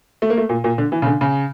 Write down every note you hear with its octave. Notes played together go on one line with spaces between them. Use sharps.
A3
A#3
A3
A#2
A#2
D3
E3
C#3
D3
C#3